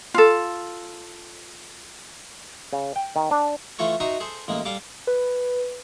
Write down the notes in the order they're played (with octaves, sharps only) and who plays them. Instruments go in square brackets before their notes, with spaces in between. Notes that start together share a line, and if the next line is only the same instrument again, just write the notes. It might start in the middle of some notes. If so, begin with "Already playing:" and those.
[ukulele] F4 A4
[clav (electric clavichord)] C#3
G5
D#3
D4
[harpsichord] E3 A3 F4 A4 C#5
D#4 F#4 E5 A#5 C6 D#6
G#4 A4 C5
A1 G#3 A#3
G3 A4 F5 D6
[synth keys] B4